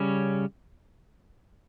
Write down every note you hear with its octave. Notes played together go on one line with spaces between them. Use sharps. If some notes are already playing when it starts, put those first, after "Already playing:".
Already playing: C#3 G3 C#4